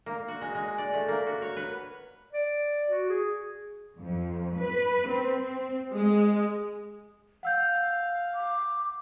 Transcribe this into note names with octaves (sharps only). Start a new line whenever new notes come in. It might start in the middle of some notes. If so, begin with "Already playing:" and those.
A#3
F#4
G#3
G#3
D5
A3
A#3
F#4
C#5
B4
D5
F#4
G#4
F2
B4
C4
G#3
F5 F#5 E6 G6
D6